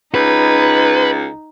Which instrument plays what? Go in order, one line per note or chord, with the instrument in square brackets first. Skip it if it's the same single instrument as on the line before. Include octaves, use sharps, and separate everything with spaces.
[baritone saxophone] C#2 [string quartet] D#4 [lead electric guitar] B4